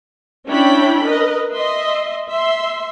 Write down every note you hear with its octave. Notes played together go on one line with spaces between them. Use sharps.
C#4 D4 E4 C#5 G5 B5
A#4 B4 D#5
D#5 E5 C6
E5 C6